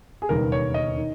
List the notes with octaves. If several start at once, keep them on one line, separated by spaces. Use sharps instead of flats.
G#4
E1 D#2 C#3 G3 B3 A#4
C#5
D#5
D#3